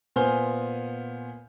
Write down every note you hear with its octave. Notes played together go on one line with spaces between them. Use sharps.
A#2 B3 C5 G#5 F6 G7